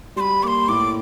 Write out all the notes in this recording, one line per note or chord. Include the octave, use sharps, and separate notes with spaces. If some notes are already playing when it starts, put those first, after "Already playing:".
G3 B5 C6
A#3 C6 D6
A2 D6